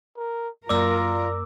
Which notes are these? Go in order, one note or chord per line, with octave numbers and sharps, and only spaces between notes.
A#4
F#2 A#3 F4 A#4 D5 D6 E6